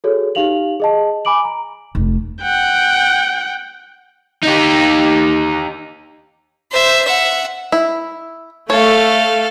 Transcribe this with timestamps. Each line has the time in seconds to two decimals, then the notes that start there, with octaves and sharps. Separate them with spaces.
0.04 F#4 G#4 A4 C#5
0.35 D#4 G4 F5 F7 F#7
0.80 G#4 D#5 A5
1.25 G#5 B5 D6 D7 F#7
1.45 A#5
1.95 F1
2.43 F#5 G5
4.43 D#4 G4
6.71 C5 E5
7.05 E5 F#5
7.72 E4
8.70 A3 A4 C#5 F5